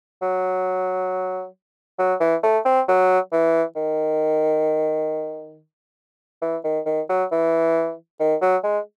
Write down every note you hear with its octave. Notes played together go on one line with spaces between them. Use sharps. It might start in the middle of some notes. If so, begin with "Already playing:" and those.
F#3
F#3
E3
A3
C4
F#3
E3
D#3
E3
D#3
D#3
F#3
E3
D#3
F#3
G#3